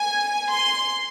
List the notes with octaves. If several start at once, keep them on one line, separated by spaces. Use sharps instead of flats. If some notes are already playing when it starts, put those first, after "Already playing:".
Already playing: G#5
C6